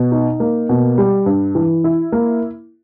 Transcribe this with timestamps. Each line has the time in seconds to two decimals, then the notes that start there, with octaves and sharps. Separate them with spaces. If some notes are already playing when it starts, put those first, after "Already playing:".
Already playing: B2
0.12 D#4
0.40 A#3
0.69 B2
0.98 G3
1.26 G2
1.55 E3
1.84 E4
2.12 A#3